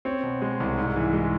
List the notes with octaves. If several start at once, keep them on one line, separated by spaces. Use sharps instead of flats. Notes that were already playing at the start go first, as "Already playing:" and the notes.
C4 C#5
B2
G#3
C2
G#2
E3
G#3